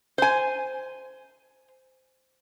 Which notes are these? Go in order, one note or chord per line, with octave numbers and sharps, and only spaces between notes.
C5 G#5